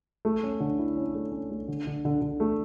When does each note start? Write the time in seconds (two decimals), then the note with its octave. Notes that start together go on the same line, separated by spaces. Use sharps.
0.25 A3
0.43 C#4
0.60 D3
0.79 E4
0.97 C#4
1.15 A3
1.32 C#4
1.50 A3
1.68 D3
1.87 D3
2.05 D3
2.22 D3
2.40 A3